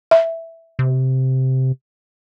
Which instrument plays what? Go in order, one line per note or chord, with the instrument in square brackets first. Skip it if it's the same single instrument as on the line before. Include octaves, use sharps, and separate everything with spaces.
[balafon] E5
[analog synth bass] C3